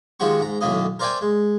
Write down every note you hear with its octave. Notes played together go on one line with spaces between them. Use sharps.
D#3 F3 G#3 F#4 G4 C#6
G#2 A#5
B1 F#2 A2 D#3 A#3 D#5
A#4 C5 D5 E5 G5 G#5
G#3